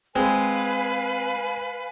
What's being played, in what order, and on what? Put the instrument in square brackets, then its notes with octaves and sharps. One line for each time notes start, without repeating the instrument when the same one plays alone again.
[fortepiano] G#3 [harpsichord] C4 [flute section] B4 F5 G#5